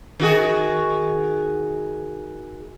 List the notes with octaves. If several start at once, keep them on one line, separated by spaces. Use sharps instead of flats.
D#3 F#4 G#4